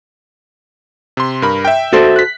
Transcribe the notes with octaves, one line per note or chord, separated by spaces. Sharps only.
C3 C6
G2 A#4 B5
E5 G5
F#4 A4 C5
F#6 B6